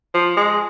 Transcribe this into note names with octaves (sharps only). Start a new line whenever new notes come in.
F3
G#3